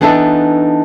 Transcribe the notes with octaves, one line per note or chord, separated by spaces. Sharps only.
E3 B3 D4 D#4 A4 E5